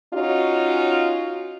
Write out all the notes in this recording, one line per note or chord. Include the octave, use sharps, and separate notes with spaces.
C#4 D#4 F4 F#4